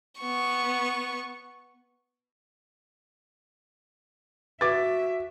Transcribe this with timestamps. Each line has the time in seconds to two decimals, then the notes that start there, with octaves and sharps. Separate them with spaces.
0.21 B3 C#6
4.61 F#4 B4 E5 D6 A6